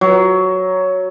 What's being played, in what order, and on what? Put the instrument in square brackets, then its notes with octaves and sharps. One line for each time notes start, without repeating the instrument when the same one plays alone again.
[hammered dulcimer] F#3